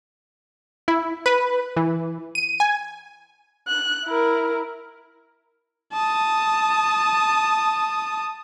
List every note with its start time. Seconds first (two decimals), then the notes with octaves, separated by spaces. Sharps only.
0.88 E4
1.26 B4
1.76 E3
2.35 D#7
2.60 G#5
3.68 F#6
4.06 E4 A#4
5.93 A5 D#6